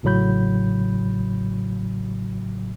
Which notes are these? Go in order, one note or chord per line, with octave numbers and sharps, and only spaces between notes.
A1 A2 C#3 F#3 B5 G6